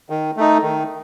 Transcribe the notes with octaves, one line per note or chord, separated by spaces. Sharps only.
D#3
A3 D#4
D#3